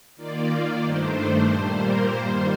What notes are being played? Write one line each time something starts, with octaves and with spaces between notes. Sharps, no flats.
D#3 A#3 F4 D5
G2 D#3 A3 D4 C5
A#2 G3 A#3
A#4
G2 D#3 A#3 C5